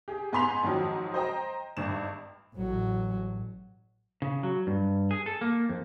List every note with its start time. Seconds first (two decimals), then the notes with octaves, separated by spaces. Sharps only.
0.08 G4 G#4
0.32 G#2 B3 G#5 C6 B6 F7
0.63 G#2 D#3 F3 F#3
1.14 C5 D#5 G5 A#5
1.77 G#1 G2 E7
2.55 A1 F#3
4.22 C#3
4.43 F#3
4.67 G2
5.11 G#4
5.26 A4
5.41 A#3
5.69 F2